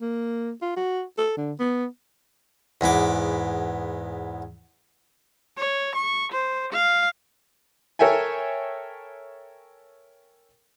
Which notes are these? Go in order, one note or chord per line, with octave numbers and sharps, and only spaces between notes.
A#3
F4
F#4
A4
D3
B3
E2 G#2 B3 D6
C#5
C#6
C5
F5
A4 A#4 C#5 E5 G5 G#5